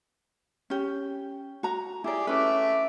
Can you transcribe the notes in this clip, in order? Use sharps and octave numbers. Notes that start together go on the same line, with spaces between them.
C#4 G4
F#4 A#5
E4 G4 G#4 D5
A3 C#4 B4 E5 D6